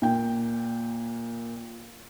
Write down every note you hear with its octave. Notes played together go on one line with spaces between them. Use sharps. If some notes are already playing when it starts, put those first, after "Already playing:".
A#2 G5